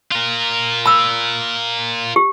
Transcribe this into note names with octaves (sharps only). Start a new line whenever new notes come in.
F4 A#4
B5 E6
G4